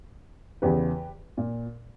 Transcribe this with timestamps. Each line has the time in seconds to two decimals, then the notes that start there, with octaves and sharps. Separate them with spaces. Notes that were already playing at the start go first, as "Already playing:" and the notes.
0.62 E2 C#3 E3 G4 B4
1.37 A#2